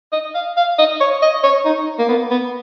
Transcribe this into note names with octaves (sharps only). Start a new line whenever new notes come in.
D#5
F5
F5
D#5
C#5
D#5
C#5
D#4
A#3
B3
B3